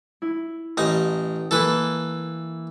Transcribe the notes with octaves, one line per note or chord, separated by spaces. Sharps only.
E4
A1 D#4
E3 A#3 E4 A4 B4